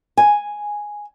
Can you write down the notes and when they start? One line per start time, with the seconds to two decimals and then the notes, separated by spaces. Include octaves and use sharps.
0.17 G#5